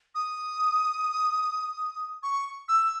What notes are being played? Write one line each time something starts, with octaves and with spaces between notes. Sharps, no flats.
D#6
C#6
E6